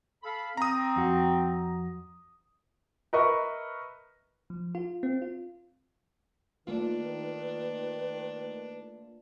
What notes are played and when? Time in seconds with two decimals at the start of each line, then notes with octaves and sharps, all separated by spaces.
0.23 A4 F5 B5
0.57 C4 A#5 D#6
0.96 F2 F#4
3.13 A#4 B4 D#5 E5 B5 C#6
4.50 F3
4.75 F4
5.03 C4
5.22 F4
6.67 D#3 A3 A#3 D4 F4 B4